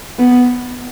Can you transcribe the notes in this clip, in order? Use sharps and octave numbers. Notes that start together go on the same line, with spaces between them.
B3